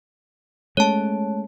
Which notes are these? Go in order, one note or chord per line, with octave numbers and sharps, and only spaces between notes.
G#3 A3 C#4 C#5 A5